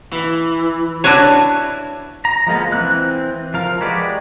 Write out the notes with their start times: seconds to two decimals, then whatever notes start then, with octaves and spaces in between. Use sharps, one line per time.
0.12 E3
1.04 D4 E4 F#4 B4 C#5
2.25 A#5
2.47 F3 G#3 A#3 B3
2.72 E3 C4 F#6
3.54 F3 A#4 F5
3.81 G#3 F#4 G4 B4 D5